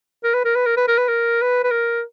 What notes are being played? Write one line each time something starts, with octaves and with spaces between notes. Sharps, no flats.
A#4
B4
A#4
B4
A#4
B4
A#4
B4
A#4
B4
B4
A#4